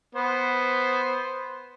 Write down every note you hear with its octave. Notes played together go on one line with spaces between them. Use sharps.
B3 C5